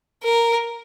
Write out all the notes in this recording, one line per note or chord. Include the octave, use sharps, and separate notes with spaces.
A#4